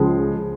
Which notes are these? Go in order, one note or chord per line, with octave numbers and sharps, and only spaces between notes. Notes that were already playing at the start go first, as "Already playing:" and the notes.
Already playing: C#2 C#3 F3 G#3